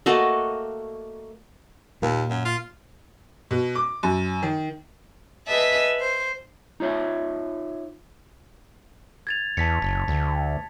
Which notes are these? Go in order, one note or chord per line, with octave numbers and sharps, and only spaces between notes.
A3 A#3 F#4 D#5
D#2 A#2 A#3
F#2
F4
B2
D6
F#2
D#3
G#4 B4 D#5 E5 A5
C5
D#4 F4 C#5 E5
G#6 A6 F7
E2 A5 B6 C#7
F#1
D2